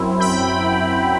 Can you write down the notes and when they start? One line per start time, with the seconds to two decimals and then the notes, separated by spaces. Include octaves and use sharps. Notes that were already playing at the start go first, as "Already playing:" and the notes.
Already playing: F#2 F#3 C4 E4
0.20 G5 B5